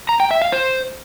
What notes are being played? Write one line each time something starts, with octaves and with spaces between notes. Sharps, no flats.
A#5
G5
E5
F5
C5